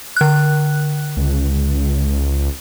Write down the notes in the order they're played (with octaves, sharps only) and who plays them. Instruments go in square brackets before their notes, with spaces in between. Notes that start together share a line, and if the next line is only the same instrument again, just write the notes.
[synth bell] D3 F#6
[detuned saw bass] C#2